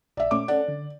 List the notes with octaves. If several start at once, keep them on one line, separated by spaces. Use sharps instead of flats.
A#1 D5 E5
A#2 A3 C#4 D6
C#4 A4 D5 F#5
D3